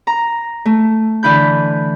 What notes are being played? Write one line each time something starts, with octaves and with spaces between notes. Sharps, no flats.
A#5
A3
D3 E3 E4 B5 G6